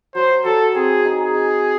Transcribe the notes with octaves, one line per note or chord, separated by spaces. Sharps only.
F#3 C5
F#3 A4
C4 G#4
D#4
G#4
D#4